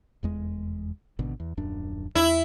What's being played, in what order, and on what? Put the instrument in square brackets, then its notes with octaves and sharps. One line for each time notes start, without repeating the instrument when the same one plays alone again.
[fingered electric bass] F1 E2 G#3
G#1 B2 D3
E2
D#1 F#2 D4
[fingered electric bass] E2 [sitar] E4